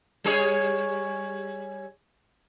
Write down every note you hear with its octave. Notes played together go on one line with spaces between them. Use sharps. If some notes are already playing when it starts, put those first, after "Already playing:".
G3 G#4 C#5